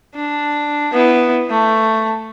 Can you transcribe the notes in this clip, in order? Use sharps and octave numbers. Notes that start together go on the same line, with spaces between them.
D4
B3 E4
A3